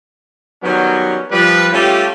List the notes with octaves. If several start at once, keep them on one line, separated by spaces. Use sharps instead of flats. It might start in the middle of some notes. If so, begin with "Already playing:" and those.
D#3 F#3 G3 B3 C#4
F3 G3 B4
G3 A3 C#4 F4 G4